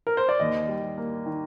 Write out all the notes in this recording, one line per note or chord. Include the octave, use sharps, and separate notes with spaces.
A#4
C5
D5
D#2 D#5
G3
A#3
D#3